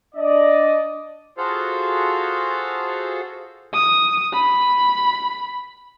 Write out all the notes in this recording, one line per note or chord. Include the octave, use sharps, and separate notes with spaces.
D4 D5 D#5
F4 F#4 G#4 A4 C5 F5
D#6
B5